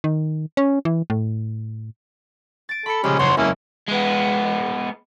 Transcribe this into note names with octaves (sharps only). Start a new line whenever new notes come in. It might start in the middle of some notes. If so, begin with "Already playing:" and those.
D#3
C#4
E3
A2
A6 D7
A4 B5 C#7
A#1 C#3 G3 G#3 C#4
F#1 E2 C#5 F#5 C6
G#3 A#3 C#4 E4
G#3 B3